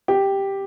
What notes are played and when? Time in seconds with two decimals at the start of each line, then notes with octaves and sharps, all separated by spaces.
0.08 G4